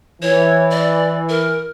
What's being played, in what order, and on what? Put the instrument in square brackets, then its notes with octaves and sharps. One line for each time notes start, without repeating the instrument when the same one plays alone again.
[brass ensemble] E3 [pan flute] C#5
[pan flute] D5
A#4